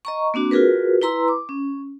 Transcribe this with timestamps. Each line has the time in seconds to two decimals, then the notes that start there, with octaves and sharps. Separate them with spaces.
0.05 D#5 A#5 C#6
0.34 A#3 C4 D4 F#4
0.51 F4 F#4 G#4 A#4 B4
1.02 E4 B4 A#5 C6 E6
1.28 D6
1.49 C#4